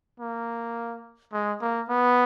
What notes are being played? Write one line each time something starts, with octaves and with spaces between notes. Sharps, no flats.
A#3
G#3
A#3
B3